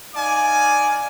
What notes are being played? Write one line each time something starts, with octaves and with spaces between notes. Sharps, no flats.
D#4 D5 F5 G#5 D6